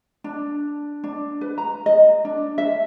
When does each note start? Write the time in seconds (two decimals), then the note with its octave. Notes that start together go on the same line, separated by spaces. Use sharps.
0.24 D4
1.04 D4
1.41 B4
1.58 A#5
1.86 D#5
2.25 D4
2.58 E5